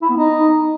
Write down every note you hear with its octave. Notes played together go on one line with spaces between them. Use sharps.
E4
B3
D#4